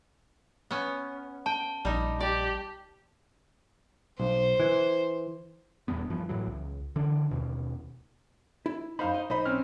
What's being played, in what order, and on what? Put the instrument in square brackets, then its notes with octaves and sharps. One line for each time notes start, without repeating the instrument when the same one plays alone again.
[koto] B3 C#4
[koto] G5 [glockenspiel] A5
[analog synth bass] A#1 [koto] G3 D#4
[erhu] G4 [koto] D5
[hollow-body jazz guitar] B1 [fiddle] C5
[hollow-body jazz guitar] E3
[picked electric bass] D#1 E2 G2 B3
G2 E3 F3
A2 E3 F#3
C#2
D3 E3 D4
D#2 B2
[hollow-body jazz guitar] E4
[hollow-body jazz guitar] F#2 F5 B5 [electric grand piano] D#4 C5
[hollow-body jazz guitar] D#5
[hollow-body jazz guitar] B1 C5 D#5 [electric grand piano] D#4 B5
[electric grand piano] C4 C#4 F6